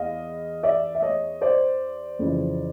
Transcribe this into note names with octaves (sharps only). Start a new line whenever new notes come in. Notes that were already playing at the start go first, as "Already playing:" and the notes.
Already playing: E2 D#5 F5
D5 E5
E5
C#5 D#5
C5 D5
F2 C#3 E3